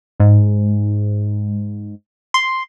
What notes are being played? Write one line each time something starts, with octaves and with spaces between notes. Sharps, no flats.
G#2
C6